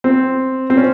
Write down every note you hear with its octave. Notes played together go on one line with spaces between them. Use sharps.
C4
C4
C#4